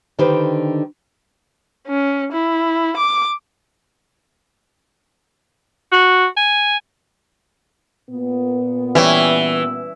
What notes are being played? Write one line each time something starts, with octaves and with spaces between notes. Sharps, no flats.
D3 D#3 D#4 G4 B4 C5
C#4
E4
D6
F#4
G#5
A#2 B3
E3 G3 C#4